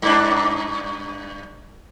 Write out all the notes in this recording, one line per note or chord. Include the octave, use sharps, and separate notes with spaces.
G2 D4